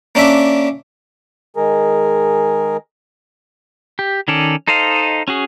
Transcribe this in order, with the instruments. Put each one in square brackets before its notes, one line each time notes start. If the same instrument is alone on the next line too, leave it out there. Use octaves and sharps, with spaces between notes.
[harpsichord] A#3 C#4 D4 E5
[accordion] D#3 G#3 G#4 A#4
[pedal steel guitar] G4
D#3 C#4 A4 D5
D#4 A4 C5 D#5 F5
C#4 F#4 G#4